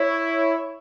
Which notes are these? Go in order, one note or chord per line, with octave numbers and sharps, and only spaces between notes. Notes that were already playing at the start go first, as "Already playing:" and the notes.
Already playing: E4 C#5